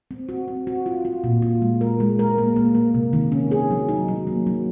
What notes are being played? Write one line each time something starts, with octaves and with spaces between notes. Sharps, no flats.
C4
F#4
C4
F#4
F4
F4
A#2
F4
G#3
A#4
G#3
A#4
A#3
A#3
A#3
C3
D#3
C#4
G#4
F#3
D#4
F#3
A#3
F#3